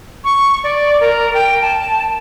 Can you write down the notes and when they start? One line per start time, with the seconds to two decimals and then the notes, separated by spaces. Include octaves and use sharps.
0.24 C#6
0.64 D5
1.01 A#4
1.34 G5
1.62 A5